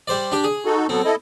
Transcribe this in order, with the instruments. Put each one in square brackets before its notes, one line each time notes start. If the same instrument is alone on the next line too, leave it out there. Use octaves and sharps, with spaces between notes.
[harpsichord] G3 C5 D5
D4 G4
G#4
[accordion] D#4 F#4 A4
[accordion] F#3 B3 A4 [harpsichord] C4
[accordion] E4 A4 D#5